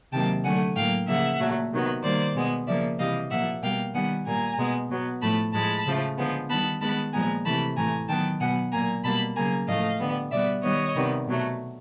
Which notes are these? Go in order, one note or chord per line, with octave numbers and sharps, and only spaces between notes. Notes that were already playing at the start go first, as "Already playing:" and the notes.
C3 D#3 F#3 A#3 G5 A5
D3 F#3 A3 F#5 G#5
A2 F#3 A#3 F5 G5
C#3 F3 A#3 E5 F#5
A#2 F#3 A3
C3 D#3 F#3 B3
D#3 G3 A#3 C5 D5
B2 G#3 B3
C#3 F3 A#3 D5 E5
C3 E3 G3 D#5 F5
A#2 F3 A#3 E5 F#5
B2 G3 A#3 F5 G5
D#3 G3 B3 F#5 G#5
A#2 G3 A#3 G#5 A#5
B2 G#3 B3
B2 F#3 B3
A2 F3 A3 A5 B5
A2 F3 G#3 A5 B5
C#3 F3 A3
D3 F3 G#3 B3
D#3 G3 B3 A5 B5
D#3 G#3 B3 A5 B5
A#2 F3 G#3 B3 G#5 A#5
C3 E3 A3 A5 B5
A2 E3 A3 G#5 A#5
D#3 F#3 B3 G5 A5
B2 F#3 B3 F#5 G#5
A#2 F#3 A#3 G#5 A#5
B2 G3 A#3 A5 B5
C#3 F#3 A#3 G#5 A#5
A2 F3 A3 D#5 F5
D3 G3 B3
B2 G3 B3 D5 E5
D#3 G3 B3 C#5 D#5
C3 D#3 G3 B3
B2 F#3 A3